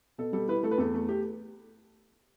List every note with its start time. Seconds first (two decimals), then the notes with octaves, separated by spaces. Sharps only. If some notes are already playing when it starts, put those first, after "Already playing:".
0.18 B2 A4
0.33 G3 A4
0.48 E4 B4
0.63 A3 A4
0.71 B4
0.78 E2 A4
0.94 A3
1.08 G4